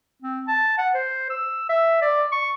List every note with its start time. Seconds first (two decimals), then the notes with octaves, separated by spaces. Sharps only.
0.22 C4
0.48 A5
0.78 F#5
0.95 C5
1.30 E6
1.69 E5
2.02 D5
2.32 C#6